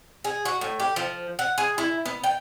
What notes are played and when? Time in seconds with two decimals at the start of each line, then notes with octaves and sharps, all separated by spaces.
0.24 G#4
0.45 F#4
0.61 A2
0.80 G4
0.96 F3
1.39 F#5
1.58 G#4
1.78 E4
2.06 B3
2.24 G5